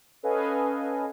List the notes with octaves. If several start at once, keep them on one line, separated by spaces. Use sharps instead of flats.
C#4 A4 B4 D#5 F5 G#5